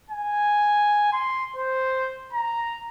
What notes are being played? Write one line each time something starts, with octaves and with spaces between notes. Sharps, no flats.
G#5
C6
C5
A#5